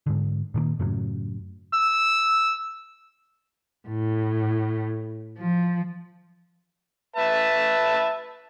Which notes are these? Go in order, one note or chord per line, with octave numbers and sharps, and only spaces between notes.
G#2 D3
A#2 D#3 F#3 A#3
F#2 A2 C#3 F#3
E6
A2
F3
B4 E5 A5